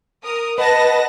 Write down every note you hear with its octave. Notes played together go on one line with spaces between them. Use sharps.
A#4 D#6
B4 D#5 F#5 A5 A#6